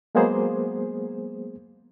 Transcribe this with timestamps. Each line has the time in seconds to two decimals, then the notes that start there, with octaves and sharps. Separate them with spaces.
0.15 F#3 G#3 A#3 B3 G#4 C5